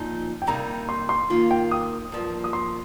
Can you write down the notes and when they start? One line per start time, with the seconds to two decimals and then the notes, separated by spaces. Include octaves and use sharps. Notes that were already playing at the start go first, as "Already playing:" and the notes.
Already playing: A#2 F3 D#4
0.42 G5
0.47 C3 G3 A#3 D#4 A#5
0.89 C6
1.09 C6
1.30 D#3 A#3 F4
1.51 G5
1.71 D#6
2.12 G2 F3 A#3
2.44 D#6
2.53 C6